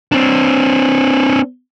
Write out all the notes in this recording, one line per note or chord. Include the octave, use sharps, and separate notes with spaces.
C4 D4